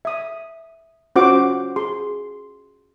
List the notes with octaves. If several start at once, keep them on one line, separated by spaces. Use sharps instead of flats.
E5 D#6
C#4 F4 F#4 C5 F#5 D6
G#4 C6